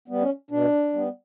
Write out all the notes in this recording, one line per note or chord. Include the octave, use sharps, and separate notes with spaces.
G3 B3
C#4
B2 D4
G3 B3